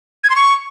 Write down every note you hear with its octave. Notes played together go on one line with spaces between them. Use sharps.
G#6
C6
C#6